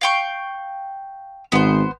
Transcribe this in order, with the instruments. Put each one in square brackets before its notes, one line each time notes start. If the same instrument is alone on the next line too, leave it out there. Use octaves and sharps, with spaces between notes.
[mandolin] F5 G5 C#6
[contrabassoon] G#1 [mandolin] B3 C5